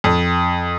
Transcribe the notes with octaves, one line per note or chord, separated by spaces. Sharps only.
F2